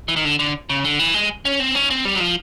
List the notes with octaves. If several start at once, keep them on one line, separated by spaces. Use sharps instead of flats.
E3
D#3
D3
D3
C#3
D3
E3
G#3
C#4
C4
C#4
C4
G3
F#3
F3